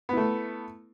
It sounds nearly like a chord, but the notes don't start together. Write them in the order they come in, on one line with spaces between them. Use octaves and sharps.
B3 E4 A3